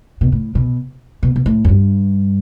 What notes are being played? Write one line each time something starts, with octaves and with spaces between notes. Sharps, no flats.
B2
A2
B2
B2
B2
A2
F#2
G2